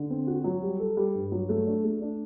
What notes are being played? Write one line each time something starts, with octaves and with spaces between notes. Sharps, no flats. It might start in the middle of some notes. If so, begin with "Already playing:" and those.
Already playing: D3
C4
F#4
F#3
G3
A4
G3
G2
F#3
A3
D4
A3
D4